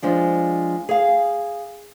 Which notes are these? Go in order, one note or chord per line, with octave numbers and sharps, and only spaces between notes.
F3 G#3 D4
G#4 F5